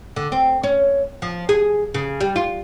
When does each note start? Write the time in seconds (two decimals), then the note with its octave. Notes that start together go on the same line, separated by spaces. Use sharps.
0.16 D3
0.32 C4
0.63 C#4
1.22 F3
1.49 G#4
1.94 C#3
2.21 G3
2.36 F4